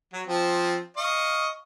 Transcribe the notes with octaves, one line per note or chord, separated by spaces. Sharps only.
F#3
F3 C4
D#5 F5 C#6